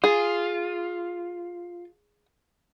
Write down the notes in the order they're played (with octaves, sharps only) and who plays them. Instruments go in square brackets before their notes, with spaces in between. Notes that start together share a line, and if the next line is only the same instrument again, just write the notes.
[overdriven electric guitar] F4 [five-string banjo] G#4